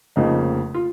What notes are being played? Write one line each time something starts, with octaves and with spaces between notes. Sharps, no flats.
F1 F2 C#3 F3 A#3 D#4
F4